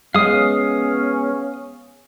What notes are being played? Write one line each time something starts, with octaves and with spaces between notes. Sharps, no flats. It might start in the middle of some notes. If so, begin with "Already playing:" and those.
G#3 B3 C#4 F5 D#6